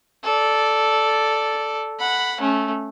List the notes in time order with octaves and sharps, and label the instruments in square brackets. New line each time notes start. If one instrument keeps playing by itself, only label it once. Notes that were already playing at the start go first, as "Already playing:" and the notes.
[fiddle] A4 D5
F#5 B5
A3 C#4